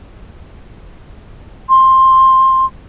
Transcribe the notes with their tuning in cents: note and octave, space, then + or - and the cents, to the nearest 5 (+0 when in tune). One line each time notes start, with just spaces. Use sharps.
C6 +15